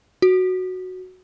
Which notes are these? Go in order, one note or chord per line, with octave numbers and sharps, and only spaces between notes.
F#4